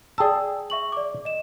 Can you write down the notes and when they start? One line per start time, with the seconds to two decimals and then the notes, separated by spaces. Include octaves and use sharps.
0.18 G#4 D5 G5 A5 E6
0.70 E5 C#6 F#7
0.92 D5 D6
1.25 D#5 E7